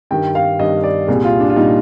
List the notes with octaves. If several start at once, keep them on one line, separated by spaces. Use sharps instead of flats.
G2 D#3 G3 G5
F5
G2 D#3 G3 D#5
D5
C2 A#2 G3 G#4
F4
D4
F4
A#2 G3 D#4